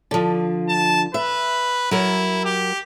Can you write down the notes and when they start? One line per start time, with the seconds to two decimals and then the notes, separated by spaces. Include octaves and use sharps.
0.11 D3 F3
0.68 A5
1.14 B4 E5
1.91 F#3 E4 A#4
2.45 G4